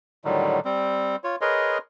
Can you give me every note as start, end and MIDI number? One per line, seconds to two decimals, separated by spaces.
0.25 0.60 45
0.25 0.60 50
0.25 0.60 51
0.25 0.60 54
0.25 0.60 55
0.65 1.16 55
0.65 1.16 60
1.24 1.36 65
1.24 1.36 73
1.41 1.78 68
1.41 1.78 70
1.41 1.78 71
1.41 1.78 73
1.41 1.78 75
1.41 1.78 84